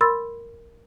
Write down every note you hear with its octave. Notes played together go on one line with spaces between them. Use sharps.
A#4 B5 C6 E6 A6